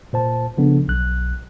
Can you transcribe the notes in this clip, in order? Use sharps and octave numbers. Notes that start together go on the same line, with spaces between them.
A#2 C5 A5
C#3 F3 B3 D4 A4
B1 F#6